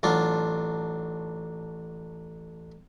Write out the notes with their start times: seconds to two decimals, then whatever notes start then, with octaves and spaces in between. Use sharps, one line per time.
0.03 A1 F#3 D4 F4